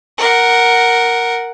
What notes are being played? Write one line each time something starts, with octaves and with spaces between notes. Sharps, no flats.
A#4 F#5